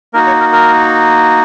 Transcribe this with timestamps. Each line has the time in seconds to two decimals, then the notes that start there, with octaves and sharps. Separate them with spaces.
0.13 A#3 D#4 F#4 A#4
0.27 C#5
0.40 A#4
0.52 A#4